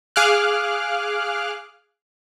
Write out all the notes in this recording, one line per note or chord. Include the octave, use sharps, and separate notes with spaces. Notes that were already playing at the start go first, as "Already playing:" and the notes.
G#4 F5 D6 F6 F#6